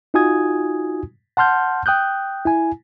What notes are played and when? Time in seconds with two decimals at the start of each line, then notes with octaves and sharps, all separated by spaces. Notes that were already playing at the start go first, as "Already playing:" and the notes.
0.14 D#4 F4 F#4 G#5 D#6 G#6
1.37 F#5 A5 C6 F6 G6
1.86 G5 D#6 F#6 G6
2.45 E4 G#5